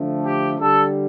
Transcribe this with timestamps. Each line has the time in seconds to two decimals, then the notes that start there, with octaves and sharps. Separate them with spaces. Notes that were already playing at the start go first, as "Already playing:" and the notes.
Already playing: D3 F3 A3
0.25 G4
0.58 D3 G3 A4